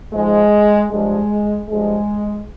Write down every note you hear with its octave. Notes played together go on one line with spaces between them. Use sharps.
G#2 F3 G#3
G2 F3 G#3
G2 F3 G#3